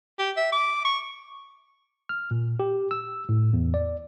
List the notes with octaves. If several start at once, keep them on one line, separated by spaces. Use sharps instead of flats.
G4
E5
D6
C#6
F6
A#2
G4
E6
A2
E2
D5